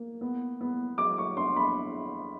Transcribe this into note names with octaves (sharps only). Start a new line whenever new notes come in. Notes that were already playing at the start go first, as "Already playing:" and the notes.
Already playing: A#3
B3
B3
F#3 D6
C#6
D4 C6
B5